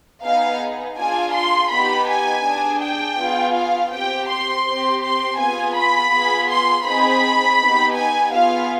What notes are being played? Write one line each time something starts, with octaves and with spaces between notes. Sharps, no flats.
B3 D#4 G#4 F5
D4 F4 G#4 G#5
C6
B3 D#4 G4 B5
G#5
D4 G#4
G5
B3 F4 G#4
F5
C4 G4 G5
C6
C4 G4
C6
B3 F4 G#4 G#5
B5
B3 F4 G#4
C6
C4 D#4 G#4 B5
B3 D#4 G4
G#5
B3 F4 G#4 F5